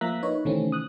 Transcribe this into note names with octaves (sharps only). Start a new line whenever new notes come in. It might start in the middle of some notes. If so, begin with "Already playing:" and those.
F3 A#3 E5 A#5 F#6 B6
D#4 B4 C#5
C3 D#3 E3 A3 C4 C#4
D#6 F#6